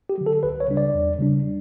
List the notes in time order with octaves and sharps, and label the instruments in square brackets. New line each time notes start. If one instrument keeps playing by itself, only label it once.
[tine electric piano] G4
D3 F#3
A4
C#2 B4
C#5
C#3 G3 D4
D5
E2
C#3 G3 D4